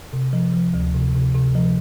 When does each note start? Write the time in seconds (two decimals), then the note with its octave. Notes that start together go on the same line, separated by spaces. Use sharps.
0.13 C3
0.33 F3
0.54 F3
0.74 D2
0.94 C3
1.14 C3
1.35 C3
1.55 F3